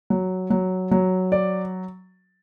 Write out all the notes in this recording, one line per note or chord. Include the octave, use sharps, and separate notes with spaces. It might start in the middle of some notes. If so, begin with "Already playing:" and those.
F#3
F#3
F#3
D5